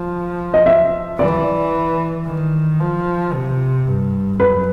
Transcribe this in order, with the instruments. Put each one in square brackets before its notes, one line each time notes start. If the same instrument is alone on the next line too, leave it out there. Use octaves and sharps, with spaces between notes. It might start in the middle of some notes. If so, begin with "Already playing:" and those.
Already playing: [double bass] F3
[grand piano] D#5
E5
[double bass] E3 [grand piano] D5
[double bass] D#3
F3
C3
G2
[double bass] F#2 [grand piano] B4